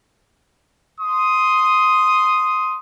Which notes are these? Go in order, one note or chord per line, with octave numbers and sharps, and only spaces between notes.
C6 D#6